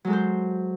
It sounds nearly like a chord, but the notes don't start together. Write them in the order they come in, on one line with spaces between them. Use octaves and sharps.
F#3 G#3 A4 C5